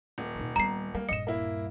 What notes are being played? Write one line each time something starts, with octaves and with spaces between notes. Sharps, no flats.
D#1
B2 D#4
G3 B3 A#5 C7
G3 A#3
D#1 G2 D#5 C#7 E7
A#3 E4